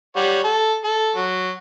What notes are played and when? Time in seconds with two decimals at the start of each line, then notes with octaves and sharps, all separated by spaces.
0.16 G3 C#5 F#5
0.44 A4
0.84 A4
1.16 F#3